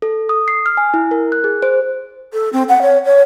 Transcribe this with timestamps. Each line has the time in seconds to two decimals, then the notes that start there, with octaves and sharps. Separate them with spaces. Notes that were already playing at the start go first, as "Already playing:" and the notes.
0.02 A4
0.29 D#6
0.48 C7
0.66 F6
0.77 G#5
0.94 E4
1.11 A#4
1.32 F#6
1.44 G#4
1.63 C5
2.33 A4
2.53 C4
2.69 F#5
2.82 C#5
3.05 C#5